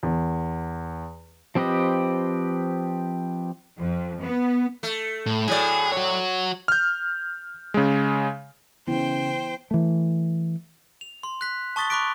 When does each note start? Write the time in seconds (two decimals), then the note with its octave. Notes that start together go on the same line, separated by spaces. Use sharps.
0.03 E2
1.55 F3 C4 G4 B4 D#5
3.77 F2
4.22 B3
4.83 A3
5.26 A2
5.48 A2 F#3 G#4 D5
5.93 F#4 C#5
6.68 F6 G6
7.74 C#3 G#3
8.87 C#3 E3 B3 E4 C5 G5
9.71 E3 A3
11.01 F7
11.23 C6
11.41 F#6 B6
11.76 A5 C#6 D#6 A6 B6 G7
11.90 B5 C#6 D6 F#6 B6 D7